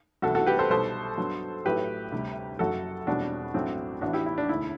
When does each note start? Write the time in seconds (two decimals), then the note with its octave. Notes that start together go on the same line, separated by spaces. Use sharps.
0.22 C2 C3 E3 B3 F#4 A4
0.35 F#4 A4
0.46 G4 B4
0.59 A4 C5
0.70 B1 B2 G3 A4 C5
1.18 G2 F#3 B3
1.65 A1 A2 F#3 A3 G4 B4
2.12 D2 C3 G3
2.59 F#1 F#2 F#3 F#4 A4
3.07 E1 E2 B2 G3 C4 D4 F#4
3.54 A1 G2 F#3 A3 C4
4.01 A1 A2 E3 B3 D4 F#4
4.13 E4 G4
4.26 E4
4.38 D4
4.49 E1 D2 D3 E4